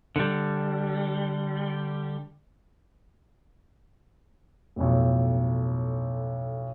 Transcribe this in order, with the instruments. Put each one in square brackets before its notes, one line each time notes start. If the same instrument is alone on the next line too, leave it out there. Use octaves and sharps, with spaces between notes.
[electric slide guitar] D3 G3
[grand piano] B1 F2 A2